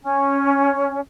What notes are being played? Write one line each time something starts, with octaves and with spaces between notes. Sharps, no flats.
C#4